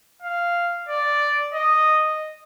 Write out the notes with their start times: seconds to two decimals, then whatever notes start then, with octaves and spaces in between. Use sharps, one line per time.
0.22 F5
0.89 D5
1.54 D#5